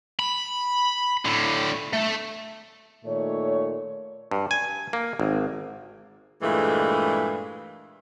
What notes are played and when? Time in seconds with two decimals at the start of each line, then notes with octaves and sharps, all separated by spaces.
0.19 B5
1.25 A2 D3
1.93 A3
3.05 A#2 D#3 A3 C#5
4.31 G2
4.51 G#5
4.93 A#3
5.20 G#1
6.42 G2 A#2 E3 G#3 A3